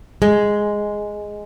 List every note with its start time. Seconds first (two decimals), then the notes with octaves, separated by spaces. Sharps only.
0.22 G#3